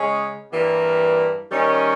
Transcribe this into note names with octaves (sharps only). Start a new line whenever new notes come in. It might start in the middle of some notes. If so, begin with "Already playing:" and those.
Already playing: C#3 G#3 C#4 G#4
G2 E3 G3 A#3
D#3 G3 C#4